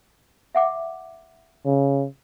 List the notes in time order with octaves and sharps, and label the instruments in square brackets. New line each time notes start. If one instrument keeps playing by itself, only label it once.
[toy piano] E5 F#5 D6
[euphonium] C#3